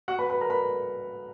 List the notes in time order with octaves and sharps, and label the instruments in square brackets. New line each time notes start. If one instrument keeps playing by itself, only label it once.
[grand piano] F#4 F#5
B4 B5
B4 B5
A#4 A#5
B4 B5